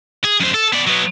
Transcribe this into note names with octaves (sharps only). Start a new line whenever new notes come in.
G#4
F#2 C5
A4
B3 D5
F#3 B3